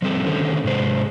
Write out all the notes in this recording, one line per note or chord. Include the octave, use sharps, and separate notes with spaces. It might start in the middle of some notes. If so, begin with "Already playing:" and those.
F3 G3 C4 A4
D3 D#3 A3 C#4 C5
G#2 C3 G#3 C5